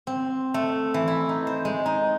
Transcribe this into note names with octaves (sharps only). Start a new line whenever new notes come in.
C4
A3
E3
E4
D#4
C5
G#3
D#4